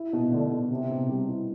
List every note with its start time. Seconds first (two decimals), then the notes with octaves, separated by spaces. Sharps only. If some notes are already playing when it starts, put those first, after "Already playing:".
Already playing: E4
0.13 B2
0.32 D3 A3
0.52 B2
0.70 C3 C4
0.90 B2
1.09 G3
1.28 E4